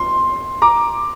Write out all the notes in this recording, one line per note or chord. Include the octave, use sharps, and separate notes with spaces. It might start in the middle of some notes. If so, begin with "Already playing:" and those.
Already playing: C6
A#5 D6